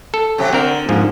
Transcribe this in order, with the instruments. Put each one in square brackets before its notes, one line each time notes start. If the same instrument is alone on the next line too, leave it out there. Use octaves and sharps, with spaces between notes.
[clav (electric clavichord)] A4
[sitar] C3 F#3 G4
[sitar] D3 [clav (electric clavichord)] C4 A#4
[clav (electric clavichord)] G#2 F3 A#3